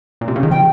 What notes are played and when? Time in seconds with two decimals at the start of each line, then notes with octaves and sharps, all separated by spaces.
0.21 A#2
0.28 C3
0.36 C#3
0.43 D#3
0.50 F3 G5